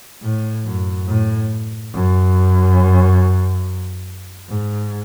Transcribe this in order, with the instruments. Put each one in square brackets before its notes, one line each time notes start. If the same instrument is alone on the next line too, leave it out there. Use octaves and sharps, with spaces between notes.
[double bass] A2
F#2
A2
F#2
G#2